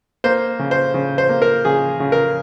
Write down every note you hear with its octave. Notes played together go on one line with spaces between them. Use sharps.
A#3 C5
C#3
C5
C#3
C5
A#3
A#4
C#3 G#4
C#3
A#4